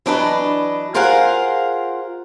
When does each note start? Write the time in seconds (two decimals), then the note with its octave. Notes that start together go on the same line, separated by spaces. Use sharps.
0.06 E3 F#3 D4 B4 D5 D#5
0.94 F4 G#4 A#4 C5 F5 F#5